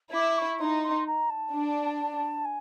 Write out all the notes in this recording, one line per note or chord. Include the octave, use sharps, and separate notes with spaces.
E4 D6
C#6
D#4 C6
C6
A#5
A5
D4
G#5